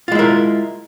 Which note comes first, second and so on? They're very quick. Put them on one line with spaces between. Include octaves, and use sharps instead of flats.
F4 G#3 E4 A#4